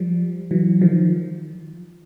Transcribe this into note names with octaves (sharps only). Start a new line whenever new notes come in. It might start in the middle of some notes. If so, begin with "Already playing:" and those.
Already playing: F3 G3
E3 F#3
D#3 F3